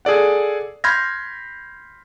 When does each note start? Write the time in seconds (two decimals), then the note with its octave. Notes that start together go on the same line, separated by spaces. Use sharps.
0.05 G#4 A4 D5 F#5
0.84 B5 C6 F6 G6 G#6 A#6